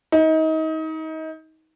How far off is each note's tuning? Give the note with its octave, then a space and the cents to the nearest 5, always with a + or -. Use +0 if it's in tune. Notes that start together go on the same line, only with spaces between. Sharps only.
D#4 +30